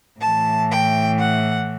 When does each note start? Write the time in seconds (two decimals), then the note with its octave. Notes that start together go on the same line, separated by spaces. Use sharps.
0.20 A2 E3 A5
0.71 G5
1.19 F#5